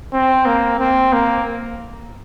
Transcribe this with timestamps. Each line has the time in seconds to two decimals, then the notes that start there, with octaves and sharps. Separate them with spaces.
0.13 C4
0.46 A#3
0.80 C4
1.13 A#3